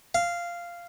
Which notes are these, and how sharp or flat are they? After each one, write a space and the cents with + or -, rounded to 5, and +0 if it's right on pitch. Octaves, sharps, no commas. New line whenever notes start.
F5 -10